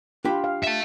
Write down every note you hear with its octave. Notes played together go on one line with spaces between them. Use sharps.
D4 F4 G4 B5
F5
E5 A5